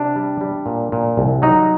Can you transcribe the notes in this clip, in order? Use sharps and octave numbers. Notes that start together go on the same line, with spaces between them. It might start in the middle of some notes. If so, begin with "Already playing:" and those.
Already playing: C3 D4
G3
G3
A#2
A#2
C2
F#3 D#4